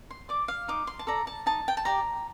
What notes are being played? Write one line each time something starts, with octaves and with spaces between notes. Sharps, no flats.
C6
D5 D6
F5
D#4 D6
C6
A5
A4 D5 A#5
A5
D#4 A5
G5
A5
G4 D5 A#5